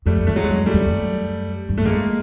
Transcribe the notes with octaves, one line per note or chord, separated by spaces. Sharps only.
F2 G3 A3
F2 A3
F#3 G#3
F#2
G3 A3
F#2
F2
F#2
G2
F#2 A3
F2 G#3 A#3